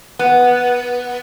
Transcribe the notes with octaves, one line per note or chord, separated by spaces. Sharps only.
B3